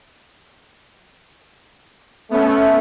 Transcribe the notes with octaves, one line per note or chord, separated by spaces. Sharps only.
A3 B3 C#4